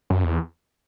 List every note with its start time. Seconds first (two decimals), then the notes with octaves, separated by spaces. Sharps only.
0.10 F#2
0.24 E2